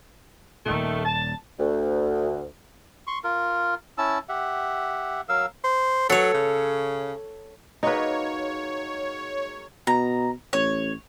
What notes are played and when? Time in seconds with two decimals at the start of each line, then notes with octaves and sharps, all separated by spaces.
0.66 D#1 A#2 D#3 A3
1.05 A5
1.60 D2
3.07 C6 C#6
3.24 F4 A#4
3.98 C#4 E4 A5 E6
4.29 G4 E5 F#5
5.29 F#3 A#4 F5 E6
5.64 C5
6.10 F#3 A4 C#5
6.34 C#3
7.83 F#3 G#3 A#3 D#4 B4 C#5
9.87 B2 A#5
10.53 A1 C#5